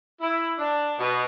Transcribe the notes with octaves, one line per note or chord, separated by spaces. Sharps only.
E4
D4
B2